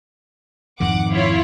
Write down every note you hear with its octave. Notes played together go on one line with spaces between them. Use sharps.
F2 G#2 D#3 F#5 D6
E4 F4 C#5